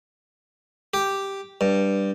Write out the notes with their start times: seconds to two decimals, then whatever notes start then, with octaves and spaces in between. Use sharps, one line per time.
0.94 G4
1.61 G2